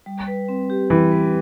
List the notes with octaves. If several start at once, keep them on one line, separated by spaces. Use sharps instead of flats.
G3
B4
C4
G4
E3 G3
B4